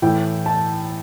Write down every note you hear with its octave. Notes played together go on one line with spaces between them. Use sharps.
A2 E3 A3 E4 G5
A5